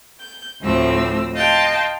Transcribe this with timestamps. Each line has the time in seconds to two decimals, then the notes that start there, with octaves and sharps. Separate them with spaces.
0.20 G6
0.61 D2 A2 F3 C4 E6
1.33 D#5 F5 G5 A5 C6